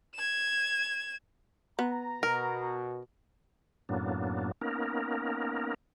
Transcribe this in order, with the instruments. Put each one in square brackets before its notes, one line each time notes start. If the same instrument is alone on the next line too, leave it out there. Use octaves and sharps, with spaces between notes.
[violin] G#6 E7
[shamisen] B3 [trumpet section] A#5
[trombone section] B2 [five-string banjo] A#4
[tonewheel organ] F#2 A2 F#3 A#3 B3 D4
A#3 B3 C#4 D#4 A#4